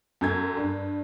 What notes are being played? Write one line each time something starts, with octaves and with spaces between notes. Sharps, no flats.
F#2 A4 G6 G#6
G2